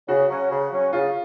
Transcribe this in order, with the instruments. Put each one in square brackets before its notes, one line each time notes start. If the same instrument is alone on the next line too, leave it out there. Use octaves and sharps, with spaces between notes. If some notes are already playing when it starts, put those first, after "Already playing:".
[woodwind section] C#3 [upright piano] F#4
[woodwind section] F#3 C#4
C#3
F#3 C#4
[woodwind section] C#3 [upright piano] F4